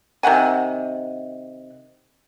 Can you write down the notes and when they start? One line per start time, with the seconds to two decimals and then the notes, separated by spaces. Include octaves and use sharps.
0.23 C3 D#3 F#5 G#5